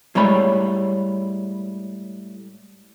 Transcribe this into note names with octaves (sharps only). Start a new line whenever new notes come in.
A2 G3 G#3 C#5 B5